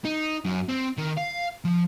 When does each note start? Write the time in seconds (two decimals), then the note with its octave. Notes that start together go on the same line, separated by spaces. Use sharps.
0.05 D#4
0.45 F#2
0.69 C4
0.97 D#3
1.17 F5
1.65 F3